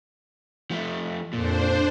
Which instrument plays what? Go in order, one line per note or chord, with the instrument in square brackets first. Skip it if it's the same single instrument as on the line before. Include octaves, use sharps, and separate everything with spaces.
[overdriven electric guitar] F3 A3
[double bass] F2 [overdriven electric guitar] A#2 [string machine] D4 C5